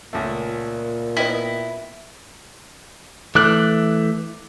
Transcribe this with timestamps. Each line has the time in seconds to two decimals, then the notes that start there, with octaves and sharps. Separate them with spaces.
0.13 C#2 A#2 A3
1.17 B3 E4 D#5 G5
3.35 E3 A3 D6 F#6